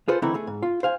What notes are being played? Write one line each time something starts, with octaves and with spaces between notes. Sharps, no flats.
F4 G#4 A4 B4 C5
D3 E3 A3 C4 D#4 E4
A3 G#4
G#2
F4
C5 F5 G#5